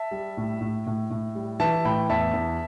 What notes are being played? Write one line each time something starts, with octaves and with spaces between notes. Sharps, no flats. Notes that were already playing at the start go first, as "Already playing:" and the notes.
Already playing: E5 A5
G3
A2
A2
A2
A2
G3
E3 E5 A5
A2 G5 B5
E2 E5 A5
E2